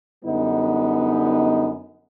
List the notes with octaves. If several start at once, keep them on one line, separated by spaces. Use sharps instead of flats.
F#2 D3 G3 B3 D#4